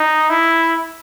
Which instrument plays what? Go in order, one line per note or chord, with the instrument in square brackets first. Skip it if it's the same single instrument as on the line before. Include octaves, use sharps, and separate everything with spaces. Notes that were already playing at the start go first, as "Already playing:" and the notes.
Already playing: [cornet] D#4
E4